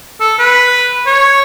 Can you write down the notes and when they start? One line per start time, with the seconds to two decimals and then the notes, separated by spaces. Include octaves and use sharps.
0.20 A4
0.39 B4
1.06 C#5